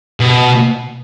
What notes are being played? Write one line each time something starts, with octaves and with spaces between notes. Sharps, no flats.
B2